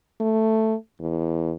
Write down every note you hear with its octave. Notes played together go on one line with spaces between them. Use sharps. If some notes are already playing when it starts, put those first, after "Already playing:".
A3
E2